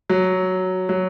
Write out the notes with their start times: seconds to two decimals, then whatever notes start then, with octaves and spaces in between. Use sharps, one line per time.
0.10 F#3
0.89 F#3